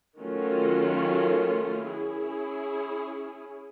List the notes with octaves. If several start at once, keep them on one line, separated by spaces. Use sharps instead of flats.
D#3 F#3 A3 C#4 F4
C#4 E4 G#4